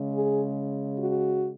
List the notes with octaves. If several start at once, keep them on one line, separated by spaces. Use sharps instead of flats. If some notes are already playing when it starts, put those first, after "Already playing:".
Already playing: C#3 G#3
G#4
F#4